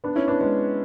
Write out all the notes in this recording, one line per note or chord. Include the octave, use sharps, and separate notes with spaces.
B3 D4
C#4 E4
B3 D4
G#3 B3